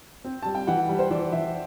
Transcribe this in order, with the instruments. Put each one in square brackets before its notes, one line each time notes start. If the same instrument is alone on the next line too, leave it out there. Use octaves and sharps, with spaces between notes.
[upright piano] C4
[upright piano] G3 [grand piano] A5
[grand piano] G5
[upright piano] E3 [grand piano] F#5
[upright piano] G3
[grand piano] C5
[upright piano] E3 [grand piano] D5
[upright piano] E3 [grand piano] E5